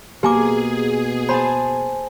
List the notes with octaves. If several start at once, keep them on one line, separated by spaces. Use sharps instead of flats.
B2 A#3 G4 G#4 G#5 D6
C5 G#5 A5 B5